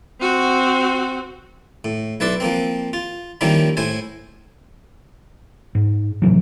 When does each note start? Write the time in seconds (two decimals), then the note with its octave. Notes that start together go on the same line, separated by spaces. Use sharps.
0.21 C4 F#4
1.85 A2
2.20 B1 E4 B4 D5 C6
2.40 F3 A#3 C4
2.93 F4
3.41 D#3 F3 G3 A#3 C#4 E4
3.77 A2 E4 C5 G#5
5.75 G#2
6.22 A2 C3 E3 F#3